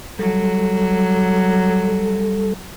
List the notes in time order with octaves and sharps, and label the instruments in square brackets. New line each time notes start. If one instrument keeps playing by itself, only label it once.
[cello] F#3 [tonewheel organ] G3 A4